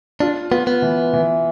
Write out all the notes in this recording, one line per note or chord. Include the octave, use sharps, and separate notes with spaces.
D4 F4
B3 F4
B3
E3
E3